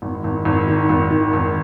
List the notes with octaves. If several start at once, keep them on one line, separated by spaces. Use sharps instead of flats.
G#1
G#1
G#1
D#3
G#1
D#3
G#1